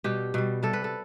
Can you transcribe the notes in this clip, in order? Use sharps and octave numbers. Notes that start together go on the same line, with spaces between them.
B2 G3 G4
B2 G3
C3 G3 A4
B4
A4